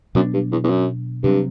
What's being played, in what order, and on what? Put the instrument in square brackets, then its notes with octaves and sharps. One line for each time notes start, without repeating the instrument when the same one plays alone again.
[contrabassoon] F#2 [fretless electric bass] B2 F#3 B3 D4
[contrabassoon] G2
E2
E2
F#2
[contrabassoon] G2 [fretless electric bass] C3 F#3 C4